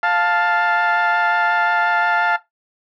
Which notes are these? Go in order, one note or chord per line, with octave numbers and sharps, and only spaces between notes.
F5 A5